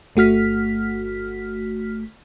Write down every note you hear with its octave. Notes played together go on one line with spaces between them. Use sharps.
G1 A3 F#4 F6 B6